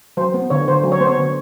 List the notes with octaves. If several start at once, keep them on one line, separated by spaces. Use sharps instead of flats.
F#3 C5
B3
D3 C#5
D3 C5
F#3
C#5
B3 C5
C#5
D3